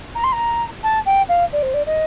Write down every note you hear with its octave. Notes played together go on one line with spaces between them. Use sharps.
A#5
C6
A#5
A5
G5
F5
D5
C5
D5
D#5